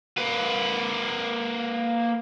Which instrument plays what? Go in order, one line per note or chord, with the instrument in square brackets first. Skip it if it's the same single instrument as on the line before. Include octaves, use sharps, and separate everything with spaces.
[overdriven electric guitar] A#3 B4